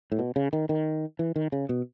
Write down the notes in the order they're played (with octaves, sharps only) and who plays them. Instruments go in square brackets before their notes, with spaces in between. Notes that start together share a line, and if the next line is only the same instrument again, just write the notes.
[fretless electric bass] A2
B2
C#3
D#3
D#3
E3
D#3
C#3
B2